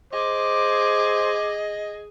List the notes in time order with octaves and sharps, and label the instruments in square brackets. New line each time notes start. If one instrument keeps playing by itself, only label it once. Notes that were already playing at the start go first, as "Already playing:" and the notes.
[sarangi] G#4 [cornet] C5 [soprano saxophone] D#5 [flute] D6